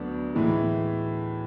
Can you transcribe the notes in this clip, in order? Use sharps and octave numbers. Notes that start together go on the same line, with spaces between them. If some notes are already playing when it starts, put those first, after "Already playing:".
Already playing: D2 D3 F#3 B3 D4
A2 E3 G#3